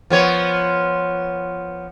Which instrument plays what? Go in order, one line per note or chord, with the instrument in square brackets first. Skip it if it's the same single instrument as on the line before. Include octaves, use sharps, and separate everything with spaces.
[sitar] F3 B3 C#5